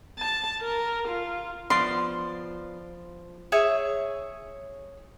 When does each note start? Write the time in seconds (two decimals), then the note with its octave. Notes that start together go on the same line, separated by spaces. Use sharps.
0.19 A5
0.62 A#4
1.08 F4
1.70 F3 B3 F4 D5 C6
3.52 G#4 C#5 E5 D#6